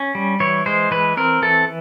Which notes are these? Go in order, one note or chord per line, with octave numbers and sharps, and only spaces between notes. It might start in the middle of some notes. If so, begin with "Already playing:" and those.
Already playing: C#4
G3
E3 C#5
G#3 C5
E3 B4
C4 A#4
E3 A4